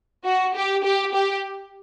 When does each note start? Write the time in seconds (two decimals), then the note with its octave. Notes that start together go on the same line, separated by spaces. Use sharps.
0.24 F#4
0.54 G4
0.83 G4
1.13 G4